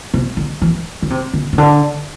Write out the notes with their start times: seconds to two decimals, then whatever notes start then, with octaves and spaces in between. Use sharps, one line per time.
0.14 C3
0.37 D3
0.62 E3
1.02 D3
1.10 C3
1.33 D3
1.53 C3
1.58 D3